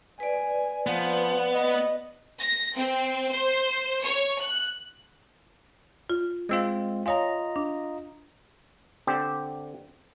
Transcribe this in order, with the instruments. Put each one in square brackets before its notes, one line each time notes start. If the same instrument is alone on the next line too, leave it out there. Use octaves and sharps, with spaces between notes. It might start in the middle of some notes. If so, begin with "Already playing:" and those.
[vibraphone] B4 D5 [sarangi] G#5
[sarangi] F3 [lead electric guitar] B3
[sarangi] D#5
[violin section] A#6
C4
C5
C#5
F#6
[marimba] F4
[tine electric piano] G#3 C4 F4 [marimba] D#5 E6
[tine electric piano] F4 D#5 A#5 [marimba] C#5 F5 G#5
[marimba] D4
[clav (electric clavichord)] D3 C4 G4